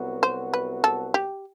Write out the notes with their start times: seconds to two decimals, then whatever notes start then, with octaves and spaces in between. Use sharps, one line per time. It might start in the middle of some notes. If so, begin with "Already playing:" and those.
Already playing: C2 C3 F#3 B3 F#4
0.23 C5
0.54 B4
0.84 A4
1.14 G4